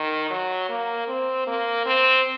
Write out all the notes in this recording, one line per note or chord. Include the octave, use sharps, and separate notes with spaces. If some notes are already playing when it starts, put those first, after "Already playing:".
Already playing: D#3
F#3
A#3
C4
A#3
C4